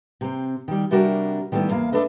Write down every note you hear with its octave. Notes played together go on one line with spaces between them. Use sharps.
C3 C4
D#3 G3
C3 G3 D4 F#4 A4 A#4
D#3 G3 A3 B3 E4
E2 A#3 F5
A3 D4 A4 B4 D#5